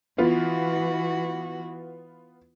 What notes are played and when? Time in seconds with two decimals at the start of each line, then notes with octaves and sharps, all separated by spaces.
0.18 E3 B3 F4 F#4